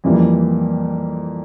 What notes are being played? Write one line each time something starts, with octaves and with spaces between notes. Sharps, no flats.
F2 E3 G3 A#3 E4